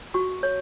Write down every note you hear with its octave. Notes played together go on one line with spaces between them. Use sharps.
F#4 C#6
C#5